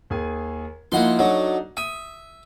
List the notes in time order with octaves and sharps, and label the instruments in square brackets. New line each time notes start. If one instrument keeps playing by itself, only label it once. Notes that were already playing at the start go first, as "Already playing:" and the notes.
[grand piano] D#2 G#4 G#5
[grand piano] F3 D#4 E4 [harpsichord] A#3 F#5 C6
[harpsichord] F#3 [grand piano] D4 D#4 A4
[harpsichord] E5 [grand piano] D#6 D#7